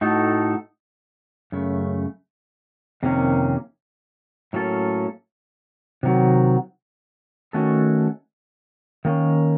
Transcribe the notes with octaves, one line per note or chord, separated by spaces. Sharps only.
A2 A3 D#4 F#4 A4
F#2 C#3 A3
F2 C3 D#3 A#3 C#4
A2 F#3 A#3 C#4 A4
C3 D#3 F#3
D#3 A3 C#4 F#4 A4
D#3 A#3 C#4